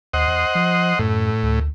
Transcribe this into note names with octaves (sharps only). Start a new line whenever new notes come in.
D#2 C5 D#5 F#5
E2
F3
F#2 A2
D2